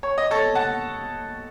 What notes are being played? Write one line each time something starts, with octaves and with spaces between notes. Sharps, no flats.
C#5
D#5
A4 C#5
F#5 A5